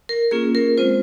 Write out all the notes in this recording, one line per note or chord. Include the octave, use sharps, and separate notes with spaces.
A#4
A#3 C#4 F4 G#4
A#4
G#3 C4 F4 C5